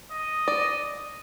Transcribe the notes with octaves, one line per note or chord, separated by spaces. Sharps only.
D#5
D5